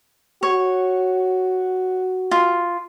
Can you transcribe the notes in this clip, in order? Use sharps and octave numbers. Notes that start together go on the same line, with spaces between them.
F#4 C#5
F4